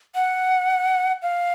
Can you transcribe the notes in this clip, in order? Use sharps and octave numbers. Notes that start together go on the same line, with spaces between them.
F#5
F5